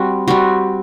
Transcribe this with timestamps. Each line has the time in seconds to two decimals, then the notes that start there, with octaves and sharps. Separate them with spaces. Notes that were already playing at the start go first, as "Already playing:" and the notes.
Already playing: G3 C4 F#4
0.28 G3 C4 F#4